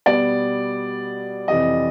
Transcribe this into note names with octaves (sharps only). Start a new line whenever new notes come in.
B2 G3 B3 D5
F2 C3 E3 D#5